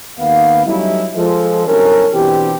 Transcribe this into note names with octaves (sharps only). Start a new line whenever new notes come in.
D#2 B3 F5
F#3 G3 A3 C#4 D#4 E4
F3 G#3 A4
G1 C2 F#3 C#4 A4 A#4
B2 E3 B3 C4 D4 G4